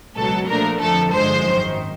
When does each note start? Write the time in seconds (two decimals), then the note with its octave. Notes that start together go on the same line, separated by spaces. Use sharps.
0.16 C#2 B2 F#3 A4
0.47 A#2 F3 A3 D4 A#4
0.80 F2 D3 F3 A3 A4
1.12 G1 G2 D3 F3 G#3 C5
1.43 G#1 F#2 D#3